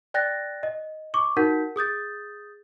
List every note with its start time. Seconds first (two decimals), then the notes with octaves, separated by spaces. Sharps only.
0.14 D5 G5 F#6 A6 A#6
0.63 D#5
1.14 C#6 D6
1.37 D#4 F#4 A#4 F#5 G6 B6
1.76 G#4 D#6 G6 A6